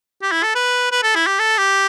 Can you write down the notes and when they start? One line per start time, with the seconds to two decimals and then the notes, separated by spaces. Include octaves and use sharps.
0.23 G4
0.32 E4
0.43 A4
0.55 B4
0.92 B4
1.03 A4
1.15 E4
1.27 G4
1.39 A4
1.58 G4